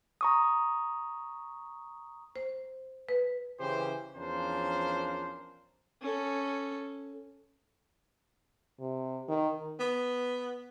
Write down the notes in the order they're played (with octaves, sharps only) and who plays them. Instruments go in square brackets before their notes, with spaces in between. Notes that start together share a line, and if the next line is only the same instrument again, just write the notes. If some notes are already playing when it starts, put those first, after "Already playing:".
[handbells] A#5 C#6 D#6
[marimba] C5
B4
[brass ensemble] C#3 E3 C#4 G4 C5
E2 F3 C#4 D4 A#4 C5
[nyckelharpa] C#4 A4
[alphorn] C3
D#3
[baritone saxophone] B3